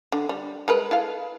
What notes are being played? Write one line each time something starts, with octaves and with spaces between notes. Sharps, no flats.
D3
G3
G#3 A#4 B4
E4 A4 F5